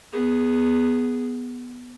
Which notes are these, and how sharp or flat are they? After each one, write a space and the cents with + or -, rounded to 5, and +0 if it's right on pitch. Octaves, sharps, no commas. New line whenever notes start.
B3 +0 G#4 +0